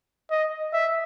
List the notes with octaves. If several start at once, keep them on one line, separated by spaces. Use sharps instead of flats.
D#5
E5